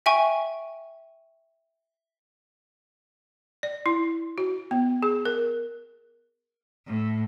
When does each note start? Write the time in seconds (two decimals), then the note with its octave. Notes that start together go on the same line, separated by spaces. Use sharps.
0.06 E5 G5 G#5 C#6
3.63 D5
3.86 E4
4.38 F#4
4.71 B3
5.03 G#4
5.25 A#4
6.86 A2